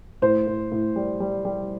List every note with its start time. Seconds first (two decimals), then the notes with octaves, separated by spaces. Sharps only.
0.22 A2 C5
0.47 A2
0.72 A2
0.96 G3
1.20 G3
1.45 G3